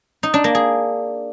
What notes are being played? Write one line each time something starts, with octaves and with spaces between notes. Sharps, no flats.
D#4
D4
A#3
G#4